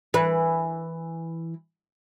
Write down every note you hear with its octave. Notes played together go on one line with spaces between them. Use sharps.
E3 B4